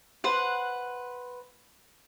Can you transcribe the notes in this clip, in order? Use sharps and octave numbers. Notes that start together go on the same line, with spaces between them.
B4 C5 F#5